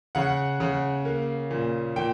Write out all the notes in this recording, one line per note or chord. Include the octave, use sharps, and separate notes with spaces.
C#3 F#5
C#3
A#3
A#2
A#2 G5